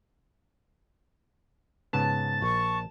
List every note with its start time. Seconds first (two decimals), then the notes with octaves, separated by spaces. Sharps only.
1.93 G#2 C#3 B3 A5
2.42 A#1 C#6